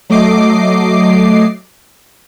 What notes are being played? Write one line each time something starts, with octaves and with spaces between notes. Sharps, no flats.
F#3 A3 D#5 D6 C7